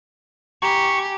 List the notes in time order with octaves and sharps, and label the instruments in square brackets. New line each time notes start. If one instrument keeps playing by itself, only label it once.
[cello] G4 [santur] G#5 A#5 B5 [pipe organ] C#6